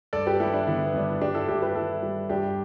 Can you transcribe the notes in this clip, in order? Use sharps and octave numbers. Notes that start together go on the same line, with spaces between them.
G2 A4 D5
G4 B4
G3 E4 A4
D4
D3 B3 E4
B3
G2 D4
E4
G2 D4 G4
E4 A4
G2 D4 G4
G4 B4
G3 E4 A4
G3
G2 D4 G4